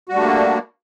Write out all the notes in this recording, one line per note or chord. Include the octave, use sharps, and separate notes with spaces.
G3 A3 A#3 D4 F#4